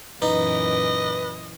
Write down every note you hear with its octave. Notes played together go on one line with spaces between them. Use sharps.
F#2 A#2 E3 D#4 B4 D#5